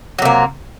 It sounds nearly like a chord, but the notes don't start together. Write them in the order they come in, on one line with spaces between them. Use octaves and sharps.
F#3 C3 A#3